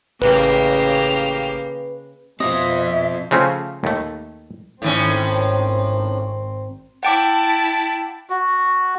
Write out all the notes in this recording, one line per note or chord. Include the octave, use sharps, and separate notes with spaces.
A1 C#3 A#3 G4 B4
F2 B2 C4 F4 C5 D#5 E5
C#3 F3 A3 C4 C#4
D#2 A3
G#1 A2 D#3 C4 C#4
E4 F#5 G5 A5 D6
F#4